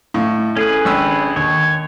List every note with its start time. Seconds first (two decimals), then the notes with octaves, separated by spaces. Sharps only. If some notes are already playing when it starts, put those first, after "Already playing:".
0.14 A2 D#5 F5 C#6
0.57 C#4 G#4 A4 B4 F#7
0.85 G#1 D4 G5 B5 E6
1.36 D#2 C#5